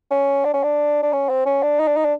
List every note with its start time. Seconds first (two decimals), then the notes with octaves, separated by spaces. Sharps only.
0.11 C#4
0.45 D4
0.54 C#4
0.63 D4
1.03 D4
1.13 C#4
1.29 C4
1.46 C#4
1.63 D4
1.80 D#4
1.88 D4
1.97 D#4
2.05 D4